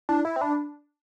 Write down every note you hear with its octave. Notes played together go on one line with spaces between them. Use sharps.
D4 E4
E4 E5
C4
D4 B5